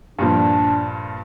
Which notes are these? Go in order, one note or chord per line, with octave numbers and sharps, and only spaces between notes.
G2 A#2 F3 D4